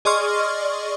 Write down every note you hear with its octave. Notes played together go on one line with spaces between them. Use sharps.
G#4 D5 D#5 C6 C#6 F6